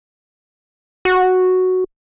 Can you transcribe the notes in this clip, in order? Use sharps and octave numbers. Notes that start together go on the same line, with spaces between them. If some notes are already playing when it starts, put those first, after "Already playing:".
F#4